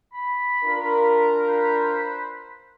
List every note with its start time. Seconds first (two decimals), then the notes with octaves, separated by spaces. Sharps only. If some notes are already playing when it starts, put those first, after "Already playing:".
0.13 B5
0.64 D4 F4 A#4
1.46 B4 C5 B5